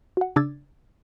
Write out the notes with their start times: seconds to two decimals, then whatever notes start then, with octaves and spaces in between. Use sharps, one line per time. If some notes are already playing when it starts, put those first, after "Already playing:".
0.17 F#4 F#5
0.36 C#3 D4 D6 E6 G#6 A6